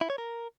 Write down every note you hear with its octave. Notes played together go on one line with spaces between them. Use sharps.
E4
C#5
A#4